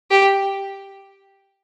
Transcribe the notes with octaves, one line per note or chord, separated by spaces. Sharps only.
G4